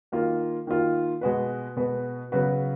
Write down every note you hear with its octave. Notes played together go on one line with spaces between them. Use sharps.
D#3 A#3 F4
D#3 A#3 F4
B2 G#3 B3 F#4 B4
B2 G#3 B3 F#4 B4
C#3 F#3 B3 F#4 B4